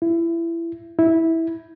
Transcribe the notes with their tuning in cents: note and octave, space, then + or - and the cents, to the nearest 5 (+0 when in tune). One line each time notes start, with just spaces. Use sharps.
E4 +25
E4 -10